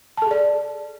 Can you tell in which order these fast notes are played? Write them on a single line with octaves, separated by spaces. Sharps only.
A5 A4 G#4 D5